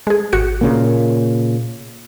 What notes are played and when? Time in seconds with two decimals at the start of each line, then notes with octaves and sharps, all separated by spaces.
0.07 G#3 G#4
0.33 G#1 F#4 C#7
0.61 A#2 C#3 A#3